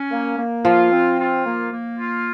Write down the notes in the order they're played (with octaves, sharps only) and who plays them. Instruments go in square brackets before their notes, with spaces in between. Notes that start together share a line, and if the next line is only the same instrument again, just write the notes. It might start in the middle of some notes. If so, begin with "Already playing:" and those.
Already playing: [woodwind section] C#4
A#3
A#3
[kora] F3 [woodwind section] F4
[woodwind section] C4
F4
A#3
A#3
F4